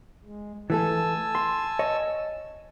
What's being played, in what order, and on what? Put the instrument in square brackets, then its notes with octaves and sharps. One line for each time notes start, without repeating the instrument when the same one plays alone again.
[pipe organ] G#3
[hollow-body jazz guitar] E3 A3 A4 [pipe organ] G#5 A5 E6
[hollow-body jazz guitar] C6
C#5 D#5